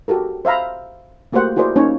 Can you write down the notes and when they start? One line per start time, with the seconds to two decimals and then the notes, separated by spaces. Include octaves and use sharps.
0.08 F#4 G4 A4 A#4
0.45 C5 E5 F5 A#5 B5
1.32 A3 A#3 F#4 G4 C5 F#5
1.56 E4 F#4 G#4 A#4 C5 D5
1.76 A#3 C#4 D#4 C#5